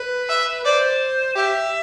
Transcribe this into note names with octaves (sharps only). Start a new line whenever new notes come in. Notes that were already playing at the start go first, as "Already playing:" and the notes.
Already playing: B4
E5
C5 D5
G4 E5